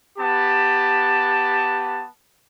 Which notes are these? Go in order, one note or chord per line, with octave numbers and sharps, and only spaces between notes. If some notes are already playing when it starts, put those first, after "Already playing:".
B3 G4 A5